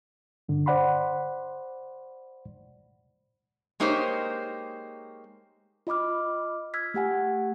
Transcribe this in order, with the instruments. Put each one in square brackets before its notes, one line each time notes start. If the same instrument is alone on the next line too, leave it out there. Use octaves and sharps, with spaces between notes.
[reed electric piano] G2 D3
C5 D5 F#5 B5 C6
[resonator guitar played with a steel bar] G#3 A#3 D#4 G4 C5 C#5
[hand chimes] F4 D#5 B5 D6 F6
E6 F6 G#6 B6
A3 G4 F#5 G#5